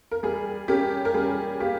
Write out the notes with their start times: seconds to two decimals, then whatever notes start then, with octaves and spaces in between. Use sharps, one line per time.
0.11 A#4
0.23 G3 G#4
0.68 C#4 G4 A#4
1.05 A#4
1.14 G3 G#4
1.60 A#3 G4